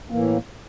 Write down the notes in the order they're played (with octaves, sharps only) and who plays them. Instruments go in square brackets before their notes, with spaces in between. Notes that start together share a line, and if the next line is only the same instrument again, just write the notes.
[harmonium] A2 E3 A#3